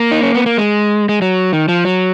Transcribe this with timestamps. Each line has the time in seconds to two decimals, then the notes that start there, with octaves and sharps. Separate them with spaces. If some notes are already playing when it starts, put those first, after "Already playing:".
Already playing: A#3
0.12 D#4
0.22 C#4
0.34 B3
0.46 A#3
0.58 G#3
1.09 G#3
1.22 F#3
1.53 D#3
1.68 F3
1.85 F#3